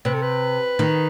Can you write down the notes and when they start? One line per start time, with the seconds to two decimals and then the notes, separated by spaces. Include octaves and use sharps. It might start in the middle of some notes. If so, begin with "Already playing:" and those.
0.05 C3 B4
0.14 A4
0.22 B4
0.79 D#3